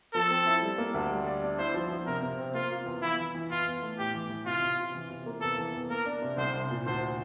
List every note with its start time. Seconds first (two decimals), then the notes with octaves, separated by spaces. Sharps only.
0.14 F3 A4
0.31 C4
0.46 E4
0.62 G3
0.78 A#3
0.94 D2
1.10 G3
1.27 D5
1.43 D4
1.58 E4 C5
1.74 F3
1.90 F3
2.06 C3 A#4
2.22 C3
2.38 C4
2.54 A#3 F4
2.70 F4
2.86 E2
3.02 E3 E4
3.18 E3
3.35 E3
3.50 E2 F4
3.66 E2
3.82 A3
3.98 A2 G4
4.14 E3
4.30 E3
4.46 C3 F4
4.63 C3
4.78 F4
4.94 E3
5.10 C3
5.26 A#3
5.41 E2 A4
5.58 E3
5.74 E2
5.90 A#3 A#4
6.06 D4
6.22 C3
6.38 C2 C5
6.54 C2
6.70 A#2
6.86 D2 C5